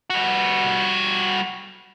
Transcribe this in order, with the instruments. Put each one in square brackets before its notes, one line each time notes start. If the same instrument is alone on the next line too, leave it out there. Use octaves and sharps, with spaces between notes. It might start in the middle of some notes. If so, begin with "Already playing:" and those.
[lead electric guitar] G3 F#4